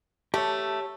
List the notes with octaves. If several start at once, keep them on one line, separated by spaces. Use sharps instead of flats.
A3 G4 C#5